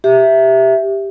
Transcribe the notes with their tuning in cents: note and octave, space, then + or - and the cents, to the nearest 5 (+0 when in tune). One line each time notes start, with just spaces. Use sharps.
G4 +0 E5 +0